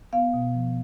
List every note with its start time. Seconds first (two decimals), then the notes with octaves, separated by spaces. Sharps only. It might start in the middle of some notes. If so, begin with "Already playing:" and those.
0.13 B3 F5
0.34 B2
0.54 F3